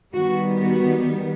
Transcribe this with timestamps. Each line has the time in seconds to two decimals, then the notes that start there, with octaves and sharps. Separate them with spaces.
0.13 D#3 G3 B3 F#4
0.61 F#4